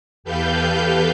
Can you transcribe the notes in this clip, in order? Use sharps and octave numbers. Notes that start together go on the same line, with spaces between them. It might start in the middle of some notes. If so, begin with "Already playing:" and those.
E2 G4 A4 B4 F5 G6